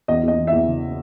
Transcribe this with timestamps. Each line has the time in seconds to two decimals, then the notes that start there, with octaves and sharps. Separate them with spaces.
0.08 E2 D#5
0.23 E2 D#5
0.38 E3
0.47 E2 E5
0.67 C#3